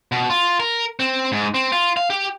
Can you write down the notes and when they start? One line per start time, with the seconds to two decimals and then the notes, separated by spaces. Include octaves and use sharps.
0.12 B2
0.30 F4
0.60 A#4
1.00 C4
1.32 G#2
1.54 C4
1.72 F4
1.97 F5
2.10 G4